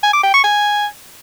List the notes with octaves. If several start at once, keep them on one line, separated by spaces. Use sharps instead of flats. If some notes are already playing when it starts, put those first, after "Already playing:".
G#5
D6
G5
C#6
G#5